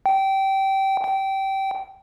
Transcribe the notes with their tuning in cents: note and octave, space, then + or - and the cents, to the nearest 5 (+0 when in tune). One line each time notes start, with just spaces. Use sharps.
G5 -20
G5 -20